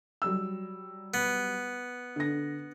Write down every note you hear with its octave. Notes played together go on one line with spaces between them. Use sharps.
F#3 G3 E6
B3
D3 A#6